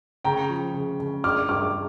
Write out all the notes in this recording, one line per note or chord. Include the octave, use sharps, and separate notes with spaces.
C#3 G5 A#5
F3
C#3
C#3
D4 D6 F6
G2 D6 F6